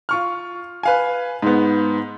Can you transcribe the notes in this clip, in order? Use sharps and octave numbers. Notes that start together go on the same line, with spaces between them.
F4 C#6 F6
B4 F5 G#5
G#2 B3